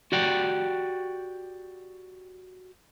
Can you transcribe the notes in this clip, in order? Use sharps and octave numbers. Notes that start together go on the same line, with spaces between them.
F#4 G4 D5 F#5 G5 A#5